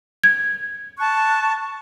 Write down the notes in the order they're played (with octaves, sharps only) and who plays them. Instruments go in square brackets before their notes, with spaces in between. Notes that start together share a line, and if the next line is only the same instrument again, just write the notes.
[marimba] G#6
[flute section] A5 C#6 F#6